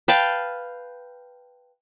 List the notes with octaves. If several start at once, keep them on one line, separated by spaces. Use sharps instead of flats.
B4 F5 G5 A5